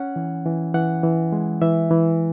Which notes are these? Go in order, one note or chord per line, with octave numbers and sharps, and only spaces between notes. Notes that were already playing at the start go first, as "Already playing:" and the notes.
Already playing: C#4 F#5
E3
E3
E3 F#5
E3
G#3
E3 E5
E3